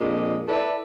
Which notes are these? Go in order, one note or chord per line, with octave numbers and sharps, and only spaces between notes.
F2 A#2 G#3 D4 D#5
E4 A4 B4 D5